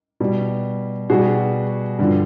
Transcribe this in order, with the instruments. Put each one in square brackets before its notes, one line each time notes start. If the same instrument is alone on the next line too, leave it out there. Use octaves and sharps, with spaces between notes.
[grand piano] B2 G3
B2 G3 F#4 G#4
G2 D3 F3